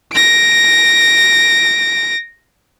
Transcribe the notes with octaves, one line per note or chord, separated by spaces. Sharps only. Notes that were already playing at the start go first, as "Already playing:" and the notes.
A#6 D7